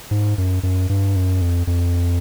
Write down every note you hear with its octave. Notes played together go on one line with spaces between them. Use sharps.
G#2
F#2
F#2
G2
F#2
F2
F2